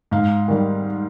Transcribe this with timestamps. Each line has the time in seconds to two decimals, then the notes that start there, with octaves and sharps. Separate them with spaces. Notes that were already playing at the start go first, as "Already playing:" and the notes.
0.11 G#2 F5
0.48 D#3 G3